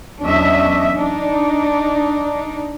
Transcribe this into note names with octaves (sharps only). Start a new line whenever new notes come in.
E2 F#3 C#4 D4 D#5 E5
D4 D#4